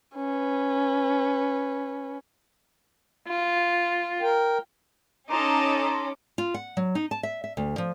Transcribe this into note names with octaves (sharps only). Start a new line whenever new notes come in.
C#4 B4
F4
A#4 G5
C#4 D#4 A4 D#5 A5 A#5 C6 D6
F4
F#5
F#3
D#4
A5
E5
E5
D2
F3